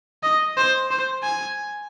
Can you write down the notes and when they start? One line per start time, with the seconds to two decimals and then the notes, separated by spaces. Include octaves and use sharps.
0.23 D#5
0.57 C5
0.91 C5
1.23 G#5